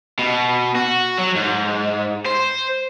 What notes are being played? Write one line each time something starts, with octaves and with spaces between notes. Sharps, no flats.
B2
F#4
F#3
G#2
C5